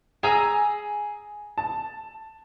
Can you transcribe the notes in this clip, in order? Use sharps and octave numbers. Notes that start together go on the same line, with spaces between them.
G#4 G#5 A#5 E6
A5